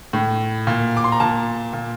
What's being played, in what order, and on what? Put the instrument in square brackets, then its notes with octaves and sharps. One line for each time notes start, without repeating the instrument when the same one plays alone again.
[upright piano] A2
A#2
D6
C6
A#5
A#2 A5
A#2